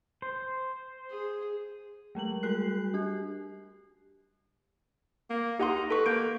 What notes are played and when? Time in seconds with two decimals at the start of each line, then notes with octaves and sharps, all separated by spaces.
0.22 C5
1.10 G#4
2.15 F#3 G#3 A3 F#7
2.43 G3 F#4 A#4 F#6 C7
2.94 D4 G4
5.30 A#3
5.59 D#4 G4 F#5 C6
5.91 A4 B4 C#6
6.06 A#3 G6 D7